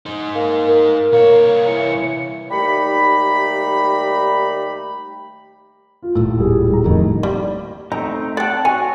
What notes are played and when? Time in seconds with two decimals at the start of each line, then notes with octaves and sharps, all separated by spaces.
0.06 D#4 C5
0.35 A#3
0.67 A#4
1.12 C2 A#3 C#5
1.67 E3 C#7
2.51 D#2 G3 A3 D#4 B5
6.02 F4
6.15 D#1 A2 E6
6.38 G3 G#4
6.70 G3 A#5
6.84 F2 A2 D#3 D#4
7.23 G3 A#3
7.92 A3 C4 D#4 A#5
8.37 D5 F#5 G5 A5
8.65 F#4 C#5 G#5